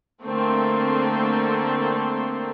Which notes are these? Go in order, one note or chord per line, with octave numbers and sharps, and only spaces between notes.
D3 A3 A#3 C4